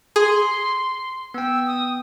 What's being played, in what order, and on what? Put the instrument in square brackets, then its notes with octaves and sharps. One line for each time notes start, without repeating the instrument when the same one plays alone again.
[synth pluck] G#4 [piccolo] C6
[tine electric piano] B3 G5 [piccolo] E6
[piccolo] D#6